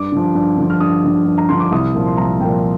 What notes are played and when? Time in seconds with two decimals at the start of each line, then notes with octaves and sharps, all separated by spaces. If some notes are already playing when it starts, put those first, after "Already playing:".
Already playing: G2 D6
0.12 D3 F3
0.35 G2
0.58 D3 F3
0.70 F6
0.80 G2 D#6
1.04 D3 F3
1.26 G2
1.38 A#5
1.49 D3 F3 C6
1.60 D6
1.72 C2 D#6
1.94 A#2 F3
2.06 C6
2.17 C2 A#5
2.40 A#2 F3 G5